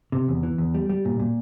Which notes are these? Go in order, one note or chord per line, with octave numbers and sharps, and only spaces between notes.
C3
E2
E3
E2
G3
G3
A#2
A#2